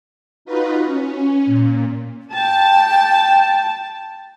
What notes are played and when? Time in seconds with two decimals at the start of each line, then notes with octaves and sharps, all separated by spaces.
0.45 D#4 F4 F#4 B4
0.86 C#4
1.46 A#2
2.34 G5 A5